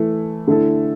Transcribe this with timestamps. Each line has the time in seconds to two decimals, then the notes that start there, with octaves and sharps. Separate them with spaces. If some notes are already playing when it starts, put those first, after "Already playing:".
Already playing: E3 A3 E4
0.47 D3 A3 E4 A4